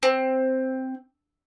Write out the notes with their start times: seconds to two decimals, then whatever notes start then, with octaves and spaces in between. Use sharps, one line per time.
0.03 C4